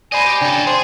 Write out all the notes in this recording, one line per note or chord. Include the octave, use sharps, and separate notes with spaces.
C5 D5 D#5 G#5 B5 A#6
G4
C#3 D4 A4 G5
G#4 C5